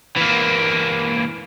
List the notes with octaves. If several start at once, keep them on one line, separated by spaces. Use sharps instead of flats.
E3 A#3